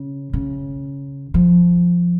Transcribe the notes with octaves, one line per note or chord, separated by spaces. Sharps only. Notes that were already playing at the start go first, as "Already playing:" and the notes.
Already playing: C#3
C#3
F3